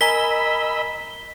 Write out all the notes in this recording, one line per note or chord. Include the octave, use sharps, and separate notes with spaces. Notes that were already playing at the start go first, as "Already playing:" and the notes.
A#4 D#5 G#5 A#5 B5 E6 B6 G7